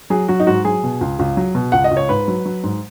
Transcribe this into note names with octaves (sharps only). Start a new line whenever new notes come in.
F#3 G#4
F#3 F#4
D#4
G#2 F#4
F#3 G#4
B2
C#2
C#2
F#3
B2
C#2 F#5
D#5
C#2
C#5
G#2 B4
F#3
F#3
G#2